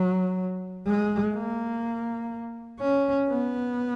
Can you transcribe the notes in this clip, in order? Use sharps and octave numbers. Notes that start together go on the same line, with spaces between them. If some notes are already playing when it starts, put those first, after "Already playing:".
Already playing: F#3
G#3
A#3
C#4
B3